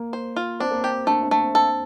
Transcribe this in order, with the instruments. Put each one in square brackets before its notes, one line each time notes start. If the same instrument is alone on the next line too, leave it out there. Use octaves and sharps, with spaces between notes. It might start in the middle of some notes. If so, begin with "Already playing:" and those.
Already playing: [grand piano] A#3
[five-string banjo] C5
F4
[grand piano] C4 [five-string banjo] D4
[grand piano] A#3
[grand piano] C4 [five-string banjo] G4
[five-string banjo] A3 [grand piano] D4
[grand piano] D4
[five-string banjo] A3
[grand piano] C4
[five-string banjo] A4